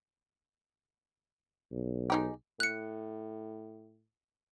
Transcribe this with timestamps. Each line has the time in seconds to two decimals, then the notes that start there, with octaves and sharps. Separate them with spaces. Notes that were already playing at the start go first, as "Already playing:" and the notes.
1.72 B1
2.10 G#3 D#4 G4
2.60 A2 F#6 C#7